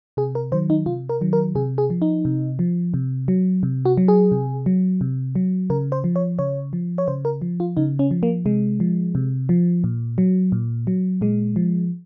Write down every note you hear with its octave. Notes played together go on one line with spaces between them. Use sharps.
C3 G#4
A#4
D#3 F#3 C5
D#4
C3 F4
A#4
D#3 F#3
A#4
C3 G#4
G#4
F3
D#4
C3
F3
C3
F#3
C3
F#4
F#3
G#4
C3
F#3
C3
F#3
C#3 A#4
C5
F3
C#5
C#3 C#5
F3
C#5
C#3 C5
A#4
F3
F4
C#3 D#4
C#4
F3
A#3
C3 G#3
F3
C3
F3
A#2
F#3
A#2
F#3
A#2 G#3
F3